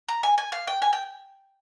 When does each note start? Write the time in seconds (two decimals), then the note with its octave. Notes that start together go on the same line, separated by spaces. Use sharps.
0.08 A#5
0.23 G#5
0.38 G#5
0.52 F5
0.67 G5
0.82 G#5
0.93 G5